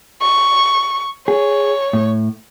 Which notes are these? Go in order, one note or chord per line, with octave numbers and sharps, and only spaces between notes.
C#6
G#4 C#5
A2